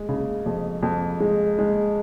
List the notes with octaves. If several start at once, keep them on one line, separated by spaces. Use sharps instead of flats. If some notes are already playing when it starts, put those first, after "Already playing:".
Already playing: G#3
C#3
F2
F2
G#3
G#3